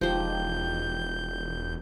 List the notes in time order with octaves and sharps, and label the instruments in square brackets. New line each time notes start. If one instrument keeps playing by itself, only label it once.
[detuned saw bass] E1 [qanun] F3 C5 [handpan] G#3 D#4 G4 [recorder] G6